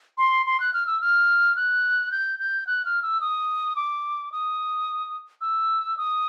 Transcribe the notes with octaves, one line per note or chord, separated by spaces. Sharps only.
C6
C6
F#6
F6
E6
F6
F#6
G6
G6
F#6
F6
E6
D#6
D6
D#6
E6
D#6